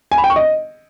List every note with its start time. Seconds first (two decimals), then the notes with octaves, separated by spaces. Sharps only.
0.12 G#5
0.18 B5
0.24 G5
0.30 C#6
0.36 D#5